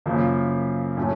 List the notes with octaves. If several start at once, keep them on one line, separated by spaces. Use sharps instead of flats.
F#2 C#3 F3 A#3
A2 F#3 A3 C#4